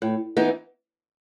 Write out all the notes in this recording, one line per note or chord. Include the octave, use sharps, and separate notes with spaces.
A2
E3 B3 D#4